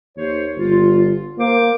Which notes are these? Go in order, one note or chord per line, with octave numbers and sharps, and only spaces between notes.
D#2 C5 C#5
G1 F4
A#3 C5 D6